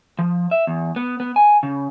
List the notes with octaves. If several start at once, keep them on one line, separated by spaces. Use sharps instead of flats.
F3
E5
E2
B3
B3
G#5
C#3